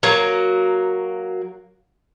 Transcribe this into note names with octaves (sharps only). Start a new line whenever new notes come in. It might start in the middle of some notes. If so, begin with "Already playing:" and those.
F#3 A#3